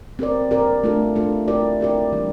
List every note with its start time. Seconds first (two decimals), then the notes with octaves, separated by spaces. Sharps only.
0.19 C4 G4 A#4 D5
0.51 C4 G4 A#4 D5
0.83 A3 D4 F4 A4
1.16 A3 D4 F4 A4
1.48 C4 E4 G4 A#4 D5
1.80 C4 E4 G4 A#4 D5
2.13 E3 G3 D4 G4